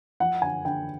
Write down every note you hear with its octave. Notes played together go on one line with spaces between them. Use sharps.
F3 F#5
D3 G#5
D3 G5